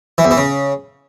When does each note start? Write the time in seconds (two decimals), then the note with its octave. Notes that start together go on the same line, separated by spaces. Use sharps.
0.18 E3
0.25 E2
0.31 E3
0.37 C#3